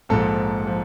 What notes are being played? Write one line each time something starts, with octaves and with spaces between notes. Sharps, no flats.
A#1 G#2 F3 A4
F3